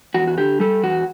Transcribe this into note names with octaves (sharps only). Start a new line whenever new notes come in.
E2 F#4
F#4
D3 G4
G3 A4
E2 F#4